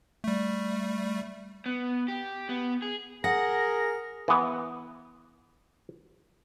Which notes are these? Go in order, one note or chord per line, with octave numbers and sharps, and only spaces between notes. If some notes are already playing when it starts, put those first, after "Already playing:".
G3 A3
B3
G4
B3
G#4
G#4 A#4 F#5 A#6
E3 B3